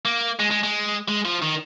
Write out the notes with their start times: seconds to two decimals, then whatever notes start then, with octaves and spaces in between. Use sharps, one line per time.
0.05 A#3
0.39 G#3
0.51 G#3
0.63 G#3
1.08 G#3
1.25 F3
1.42 D#3